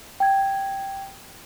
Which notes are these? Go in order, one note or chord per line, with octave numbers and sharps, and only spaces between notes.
G5 G#6